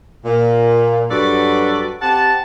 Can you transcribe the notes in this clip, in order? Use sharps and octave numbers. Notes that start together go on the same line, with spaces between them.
A#2
G2 F#3 F#4 A4 B4 D5
C4 G4 F#5 A5